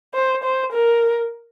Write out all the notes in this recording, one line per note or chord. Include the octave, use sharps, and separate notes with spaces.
C5
C5
A#4